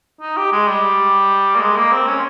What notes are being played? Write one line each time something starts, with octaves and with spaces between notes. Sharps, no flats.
D#4
G4
G#3
G3
A#3
G#3
A#3
C4
C#4